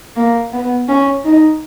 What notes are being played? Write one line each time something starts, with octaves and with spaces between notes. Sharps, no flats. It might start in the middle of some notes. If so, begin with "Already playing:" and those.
A#3
B3
C#4
D#4